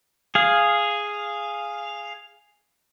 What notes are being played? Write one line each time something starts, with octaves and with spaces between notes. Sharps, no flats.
G#4 F5